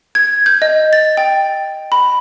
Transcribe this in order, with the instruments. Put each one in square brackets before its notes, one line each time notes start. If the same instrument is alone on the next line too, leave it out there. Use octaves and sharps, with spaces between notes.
[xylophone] G#6
G6
D#5
A6
G5
B5